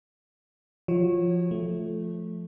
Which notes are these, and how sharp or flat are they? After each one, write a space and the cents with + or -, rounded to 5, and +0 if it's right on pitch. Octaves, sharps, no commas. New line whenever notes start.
F3 +0 F#4 +0 C#5 -20
F3 -5 A3 -10